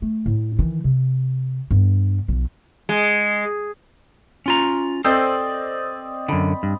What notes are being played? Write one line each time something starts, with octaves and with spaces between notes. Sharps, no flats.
A3
A2
D#3 E3
C3
G2 B3
B1 F3
G#3
C#4 F4 A#5
C4 A4 C5 D5 D#5
F#2 D3 B5
G2